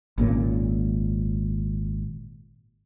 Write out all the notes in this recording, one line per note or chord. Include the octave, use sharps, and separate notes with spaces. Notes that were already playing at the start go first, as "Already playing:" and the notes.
G#1 A#2 C#3